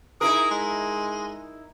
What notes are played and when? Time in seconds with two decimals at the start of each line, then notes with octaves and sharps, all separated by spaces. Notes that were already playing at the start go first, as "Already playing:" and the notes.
0.21 D#4 E4 G#4 A#4
0.51 G#3